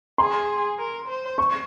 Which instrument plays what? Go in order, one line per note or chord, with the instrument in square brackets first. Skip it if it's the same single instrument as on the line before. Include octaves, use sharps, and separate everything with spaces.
[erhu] G#4 [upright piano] C6
[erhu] A#4
C5
[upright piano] C#6